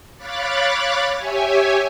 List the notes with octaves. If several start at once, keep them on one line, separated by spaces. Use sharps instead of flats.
C#5 F5 B5 D6 F#6 A6
G4 C#5 E5 G#5